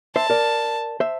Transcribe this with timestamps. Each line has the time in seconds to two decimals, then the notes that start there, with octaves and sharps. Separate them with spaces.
0.15 C5 E5 A5
0.30 A#4 D5
1.00 C5 E5